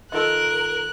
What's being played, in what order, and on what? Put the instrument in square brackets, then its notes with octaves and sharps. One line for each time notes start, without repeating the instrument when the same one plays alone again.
[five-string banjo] D#3 F4 A4 [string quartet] A#4 [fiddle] F#6